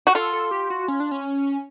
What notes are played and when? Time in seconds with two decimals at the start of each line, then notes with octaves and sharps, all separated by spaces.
0.07 F#4
0.15 F4 A4
0.33 A4
0.51 G4
0.70 F#4
0.88 C#4
1.00 D4
1.11 C#4